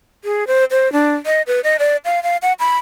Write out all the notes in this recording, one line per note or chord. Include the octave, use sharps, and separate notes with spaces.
G#4
C5
C5
D4
D#5
B4
D#5
D5
F5
F5
F#5
B5